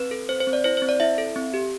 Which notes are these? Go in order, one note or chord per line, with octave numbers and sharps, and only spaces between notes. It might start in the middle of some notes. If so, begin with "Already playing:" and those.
Already playing: C4 B4
A4
C4 C5
C5
C4
D5
E4 C5
C4 C5
D5
E4 E5
A4
C4
G4